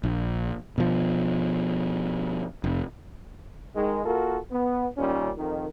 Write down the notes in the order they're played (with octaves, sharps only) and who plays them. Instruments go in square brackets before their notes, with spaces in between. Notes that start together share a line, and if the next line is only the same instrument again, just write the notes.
[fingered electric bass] A#1
B2 F3
F1
[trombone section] D#3 G#3
A#3 F4 F#4 A4 A#4
B3
A#2 D#3 G3 C#4
F2 D#3